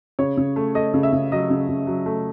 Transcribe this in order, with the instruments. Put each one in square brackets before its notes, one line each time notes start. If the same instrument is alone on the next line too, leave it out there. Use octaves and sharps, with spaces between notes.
[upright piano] C#3 C#5
C#3
A3
A3 D#5
C#3
E5
C#3
F#3 D#5
C#3
C#3
F#3
A3